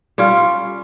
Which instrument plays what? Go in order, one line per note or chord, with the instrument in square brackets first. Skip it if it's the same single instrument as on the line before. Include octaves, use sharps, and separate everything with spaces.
[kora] G3 C#4 F4